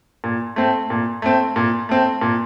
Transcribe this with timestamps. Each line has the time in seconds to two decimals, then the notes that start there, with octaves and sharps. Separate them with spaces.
0.24 A#2
0.56 A3 C4
0.90 A#2
1.22 A3 C4
1.56 A#2
1.89 A3 C4
2.21 A#2